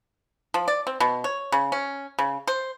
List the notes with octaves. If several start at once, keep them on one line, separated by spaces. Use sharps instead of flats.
F3
D5
C4
B2
C#5
C#3
C#4
C#3
C5